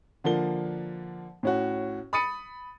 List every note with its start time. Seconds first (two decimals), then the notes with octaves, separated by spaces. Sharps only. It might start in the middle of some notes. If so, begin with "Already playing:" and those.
0.24 D3 F3 A#3 G7
1.43 A2 C#4 F#4
2.13 B5 D#6 A6 C#7 D#7